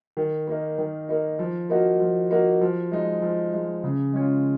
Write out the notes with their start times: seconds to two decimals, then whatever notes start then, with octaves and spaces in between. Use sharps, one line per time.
0.17 D#3
0.47 A#3 D#4
0.78 D#3
1.09 A#3 D#4
1.39 F3
1.69 A#3 D#4 F#4
2.00 F3
2.31 A#3 D#4 F#4
2.61 F3
2.92 G#3 D#4
3.22 F3
3.53 G#3 D#4
3.83 C#3
4.13 G#3 C#4 F4